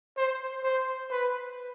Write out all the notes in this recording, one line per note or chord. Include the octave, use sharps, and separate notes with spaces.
C5
C5
B4